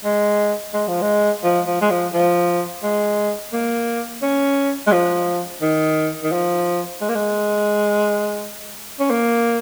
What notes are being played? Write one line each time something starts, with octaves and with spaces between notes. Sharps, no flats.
G#3
G#3
F3
G#3
F3
F3
G#3
F3
F3
G#3
A#3
C#4
G#3
F3
D#3
D#3
F3
G#3
A#3
G#3
C#4
A#3